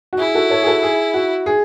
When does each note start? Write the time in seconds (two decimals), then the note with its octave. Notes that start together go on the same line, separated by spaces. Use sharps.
0.13 F#4
0.19 E4 G#4
0.35 F#4 A4
0.50 A4 C#5
0.63 G#4
0.66 F#4 A4
0.83 G#4
1.14 F#4
1.46 G#4